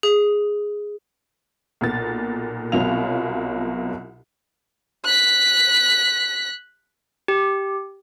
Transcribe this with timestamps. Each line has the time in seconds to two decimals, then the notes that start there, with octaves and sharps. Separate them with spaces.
0.03 G#4
1.81 B1 A#2 A6
2.72 C2 B2 F#3 F4 F7
5.05 F#6 B6
7.28 G4